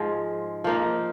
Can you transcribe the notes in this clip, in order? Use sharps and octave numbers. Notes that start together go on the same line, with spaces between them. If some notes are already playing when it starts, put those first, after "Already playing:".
Already playing: G#2 F3 G#3
F3 A#3 D#4